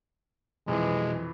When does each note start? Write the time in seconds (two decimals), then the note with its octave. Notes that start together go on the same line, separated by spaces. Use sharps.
0.68 B1 F2 E3 G#3